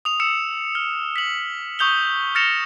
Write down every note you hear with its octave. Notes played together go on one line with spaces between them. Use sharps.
D#6 F7
E6 C#7 E7 F7
F6
B6 F#7
C#6 D#6 G6 F7 G7
F6 A6 A#6 C#7 E7 F7